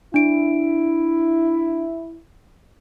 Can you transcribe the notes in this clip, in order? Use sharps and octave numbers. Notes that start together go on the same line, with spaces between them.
D4 E4 D7